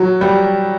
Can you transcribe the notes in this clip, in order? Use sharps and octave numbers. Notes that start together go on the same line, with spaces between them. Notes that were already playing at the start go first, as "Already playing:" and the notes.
Already playing: F#3
G3